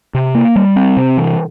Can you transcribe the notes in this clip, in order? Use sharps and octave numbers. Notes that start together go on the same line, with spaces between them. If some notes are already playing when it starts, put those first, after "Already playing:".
C3
A#3
G3
C4
C3
E3